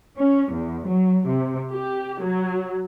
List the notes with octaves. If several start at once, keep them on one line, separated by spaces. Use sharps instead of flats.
C#4
E2
F#3
C3
G4
F#3